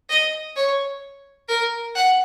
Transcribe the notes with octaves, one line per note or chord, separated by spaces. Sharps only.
D#5
C#5
A#4
F#5